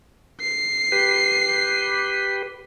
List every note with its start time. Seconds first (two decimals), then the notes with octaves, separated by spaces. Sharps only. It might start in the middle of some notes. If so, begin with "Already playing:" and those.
0.41 C7
0.92 G4 B4